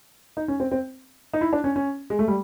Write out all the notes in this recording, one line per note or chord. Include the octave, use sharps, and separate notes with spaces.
D#4
C#4
C4
C4
D#4
E4
D4
C#4
C#4
G#3
A3
G3